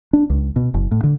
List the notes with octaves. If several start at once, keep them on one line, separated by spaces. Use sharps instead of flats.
D4
C#2
B2
F#1
A2
D3